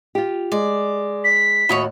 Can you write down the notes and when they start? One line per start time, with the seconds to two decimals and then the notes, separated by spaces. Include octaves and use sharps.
0.15 F4 G4
0.52 G#3 D5
1.24 B6
1.69 D#2 A2 F#4 C#5 D#5 B5